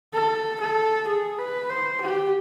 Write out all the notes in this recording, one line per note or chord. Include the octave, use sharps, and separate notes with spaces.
A4
A4
G#4
B4
C5
G4